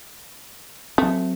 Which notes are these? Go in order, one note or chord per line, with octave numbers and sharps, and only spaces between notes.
F#3 A3 C4